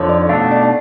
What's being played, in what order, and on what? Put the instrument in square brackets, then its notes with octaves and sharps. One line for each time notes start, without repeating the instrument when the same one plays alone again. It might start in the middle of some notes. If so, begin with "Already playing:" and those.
Already playing: [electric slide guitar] F2 D3 F3 [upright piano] C#5
[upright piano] D5
[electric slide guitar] B2 A3 D4 [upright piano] F5
[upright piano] D5